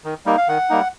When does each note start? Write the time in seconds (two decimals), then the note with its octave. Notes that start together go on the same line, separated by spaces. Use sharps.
0.04 D#3
0.26 G3 A#3 D#4
0.38 F5
0.48 D#3 F#5
0.70 G3 A#3 D#4